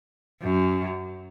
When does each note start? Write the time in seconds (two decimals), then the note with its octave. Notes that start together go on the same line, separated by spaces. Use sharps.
0.42 F#2